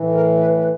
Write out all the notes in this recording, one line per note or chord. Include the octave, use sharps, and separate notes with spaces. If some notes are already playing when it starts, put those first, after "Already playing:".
Already playing: A2 E3
A#4
B4
B4